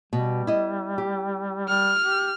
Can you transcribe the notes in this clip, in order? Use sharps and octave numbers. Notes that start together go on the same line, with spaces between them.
B2 G3
E4 D#5
G4
G3 F6
G4